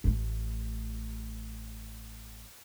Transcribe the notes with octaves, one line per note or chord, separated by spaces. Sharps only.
A1 A3